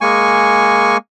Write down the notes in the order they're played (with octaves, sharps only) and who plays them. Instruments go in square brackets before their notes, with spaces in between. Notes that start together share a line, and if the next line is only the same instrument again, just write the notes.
[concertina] G#3 A#3 G#5 C#6